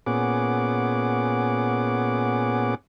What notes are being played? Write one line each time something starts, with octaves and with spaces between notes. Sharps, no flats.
A#2 B3 C#4 G#4 F#5 D6